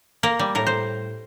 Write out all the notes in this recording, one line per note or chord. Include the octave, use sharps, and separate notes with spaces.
A#3 A#4
G3
A2 A#4
C5